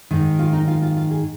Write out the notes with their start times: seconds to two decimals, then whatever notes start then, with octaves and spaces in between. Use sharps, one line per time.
0.11 G#2 D#3
0.39 F4
0.53 D#4
0.68 F4
0.82 F4
0.97 F4
1.10 G#4